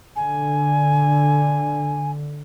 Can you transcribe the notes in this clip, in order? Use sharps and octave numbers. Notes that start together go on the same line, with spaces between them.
D3 G#5